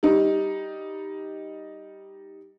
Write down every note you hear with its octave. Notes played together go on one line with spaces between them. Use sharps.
G3 D#4